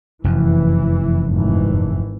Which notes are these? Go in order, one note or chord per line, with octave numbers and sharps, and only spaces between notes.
F1 F#2 E3
G#1 E3